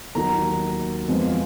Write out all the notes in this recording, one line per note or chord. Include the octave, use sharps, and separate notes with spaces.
D#2 D#3 F#3 A#5
F2 F3 G#3 B3 F4